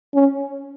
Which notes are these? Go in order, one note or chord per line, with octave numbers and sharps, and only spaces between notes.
C#4